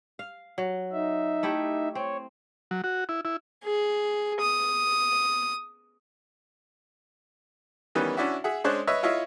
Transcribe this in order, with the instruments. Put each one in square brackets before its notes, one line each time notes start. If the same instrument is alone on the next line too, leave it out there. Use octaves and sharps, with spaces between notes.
[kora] F5
F#3
[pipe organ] D#4 E5
[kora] A3 E4 G4
[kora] C4 [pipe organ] C#5
[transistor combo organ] F#3
F#4
E4
E4
[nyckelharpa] G#4
D#6
[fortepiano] D#3 E3 G3 B3 C#4 B4
C#4 D4 E4 F#4 E5
G#4 E5 F#5
G#3 C#4 D4 C5 C#5 F#6
B4 C#5 D#5 E5 E6
E4 F4 C#5 D#5 E5